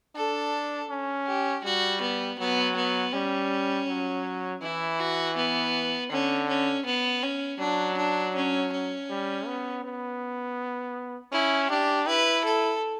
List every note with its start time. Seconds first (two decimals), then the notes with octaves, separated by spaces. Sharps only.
0.15 D4 A4
0.90 C#4
1.26 G4
1.64 G3 F#4
2.01 B3
2.39 F#3 B3
2.76 B3
3.13 G3 C#4
3.88 F#3
4.62 E3 E4
4.99 F#4
5.37 B3
6.11 D3 C#4
6.49 C#4
6.86 B3
7.23 C#4
7.59 F#3 D4
7.97 D4
8.35 C#4
8.72 C#4
9.10 G3
9.47 B3
9.84 B3
11.32 C#4 E4
11.70 D4 G4
12.07 E4 B4
12.45 A4